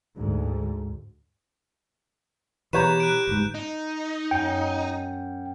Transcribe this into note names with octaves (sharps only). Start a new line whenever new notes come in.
D2 G#2
B2 E3 G4 B4 C#5 A#5 G6 E7
F#6 D7
G1 G#2
D#4
F#2 B3 G5